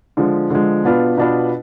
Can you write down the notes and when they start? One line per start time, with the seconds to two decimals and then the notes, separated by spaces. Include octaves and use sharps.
0.17 D3 F3 G#3
0.50 D3 F3 G#3
0.84 B2 B3 D4 F4 B4
1.17 B2 B3 D4 F4 B4